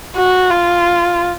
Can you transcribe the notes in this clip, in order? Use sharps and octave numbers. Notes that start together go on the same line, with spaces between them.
F#4
F4